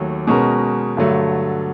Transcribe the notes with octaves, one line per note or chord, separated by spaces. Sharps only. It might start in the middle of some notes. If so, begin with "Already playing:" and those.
Already playing: D#2 D#3 F#3 A3
B2 G#3 C#4 F#4 A#4
G2 D3 F#3 A3